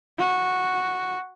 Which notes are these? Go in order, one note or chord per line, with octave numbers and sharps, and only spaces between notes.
F#4